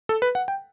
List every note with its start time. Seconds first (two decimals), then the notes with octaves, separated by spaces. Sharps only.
0.09 A4
0.22 B4
0.35 F#5
0.48 G5